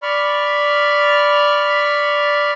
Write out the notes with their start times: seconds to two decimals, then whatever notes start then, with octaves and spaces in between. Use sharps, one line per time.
0.03 D5 B5 C#6 F6